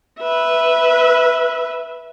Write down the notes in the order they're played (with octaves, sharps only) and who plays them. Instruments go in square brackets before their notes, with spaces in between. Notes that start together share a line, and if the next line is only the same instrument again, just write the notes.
[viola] B4 E5